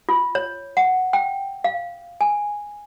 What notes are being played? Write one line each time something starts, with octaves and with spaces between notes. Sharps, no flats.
F4
C#5
F#5
G5
F5
G#5